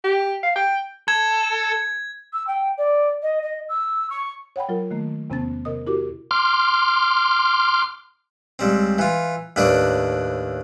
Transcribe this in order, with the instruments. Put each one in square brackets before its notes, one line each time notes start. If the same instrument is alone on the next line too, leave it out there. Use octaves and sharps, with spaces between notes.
[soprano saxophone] G4
F5
G5
[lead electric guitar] A4 [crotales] G#6
[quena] E6
G5
D5
D#5
D#5
E6
C#6
[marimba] C#5 F#5 G5 B5
F#3 F4 A#4
D#3 A3 A#3
E2 C3 B3 C#4 A5 A6
C3 A#4 D#5 D#6
E4 F#4 G4 A#4 D6
[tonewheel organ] C6 D6 F6
[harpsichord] C#2 G3 C4
E3 F4
D#2 A2 D4 B4 D5